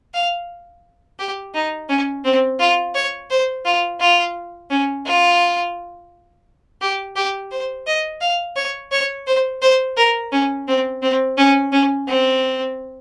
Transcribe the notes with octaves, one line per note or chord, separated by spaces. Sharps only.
F5
G4
D#4
C#4
C4
F4
C#5
C5
F4
F4
C#4
F4
G4
G4
C5
D#5
F5
C#5
C#5
C5
C5
A#4
C#4
C4
C4
C#4
C#4
C4